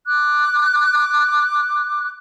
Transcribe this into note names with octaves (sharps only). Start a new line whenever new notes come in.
D6 F#6